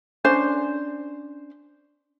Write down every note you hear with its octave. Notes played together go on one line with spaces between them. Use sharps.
C#4 D4 C5